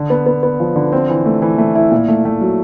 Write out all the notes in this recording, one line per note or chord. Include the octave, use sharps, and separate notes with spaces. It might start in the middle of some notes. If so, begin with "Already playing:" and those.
Already playing: D3
B3
B3
B3
F3
D3
C4
E3
A3
E3
A3
E4
A#2
A3
A3
F#3